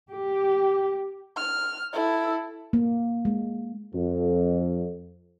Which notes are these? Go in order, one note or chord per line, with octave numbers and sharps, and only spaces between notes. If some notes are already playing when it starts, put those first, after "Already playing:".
G4
F6
E4 A4
A#3
G#3
F2